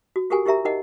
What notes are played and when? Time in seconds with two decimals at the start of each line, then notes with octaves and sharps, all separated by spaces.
0.16 F#4
0.30 F#4 G4 A4 A#4 F#5 G#5
0.46 E4 G4 A#4 E5 A#5
0.65 D#4 A#4 D#5 F#5